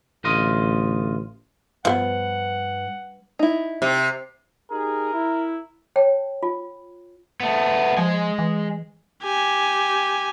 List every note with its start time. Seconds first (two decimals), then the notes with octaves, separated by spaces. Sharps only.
0.24 A1 D2 F4 D#5
1.85 G2 F3 A#3 B3 F#5
3.39 D#4 E4
3.82 C3
4.72 D#4 G4 G#4 A#4
5.13 E4
5.96 C#5 G5 A5
6.43 F4
7.40 A3 B3
7.98 F3 G#3 G#5
8.39 E3
9.24 G4 G#5